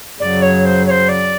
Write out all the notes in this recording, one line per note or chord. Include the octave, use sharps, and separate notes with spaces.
F#2 C#3 F#3 D5
C#5
C5
C#5
C5
D5